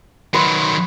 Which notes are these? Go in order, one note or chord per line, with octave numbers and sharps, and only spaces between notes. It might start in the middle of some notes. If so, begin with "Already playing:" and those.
D#3 F#3 B4 C6